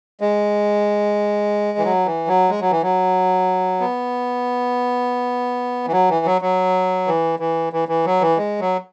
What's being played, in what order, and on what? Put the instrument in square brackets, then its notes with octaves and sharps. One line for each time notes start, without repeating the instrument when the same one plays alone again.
[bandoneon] G#3
E3
F#3
E3
F#3
G#3
F#3
E3
F#3
B3
E3
F#3
E3
F#3
F#3
E3
E3
E3
E3
F#3
E3
G#3
F#3